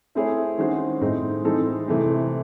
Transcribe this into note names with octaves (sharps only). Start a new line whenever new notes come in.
A3 C4 E4 G#4 C#5
D#3 G#3 C#4 F#4 C5
A2 G#3 C4 D#4
E3 G#3 C4 D#4 A4
C3 E3 A3 C4